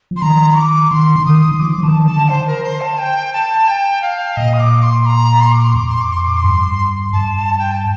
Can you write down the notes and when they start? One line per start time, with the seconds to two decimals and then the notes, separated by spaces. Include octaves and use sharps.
0.11 F3
0.16 C6
0.22 D#3 A#5
0.56 D6
0.91 D#3 C6
1.16 D3
1.26 D#3 D#6
1.51 D#3
1.60 F3 D6
1.78 F3
1.83 D#3 A5
2.06 D3 A5
2.29 C5
2.47 A#4
2.64 C5
2.81 A5
2.98 G5
3.33 A5
3.68 G5
4.02 F5
4.37 A#2 D#5
4.53 D#6
4.60 D6
4.83 C6
5.06 A#5
5.40 C6
5.52 D6
5.64 C6
5.74 F2 D6
5.88 C6
6.01 D6
6.13 C6
6.25 D6
6.37 C6
6.44 G2
7.13 G2 A5
7.36 A5
7.59 G5
7.71 A5